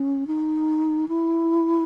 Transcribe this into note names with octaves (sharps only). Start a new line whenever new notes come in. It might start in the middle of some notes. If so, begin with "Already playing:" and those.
Already playing: C#4
D#4
E4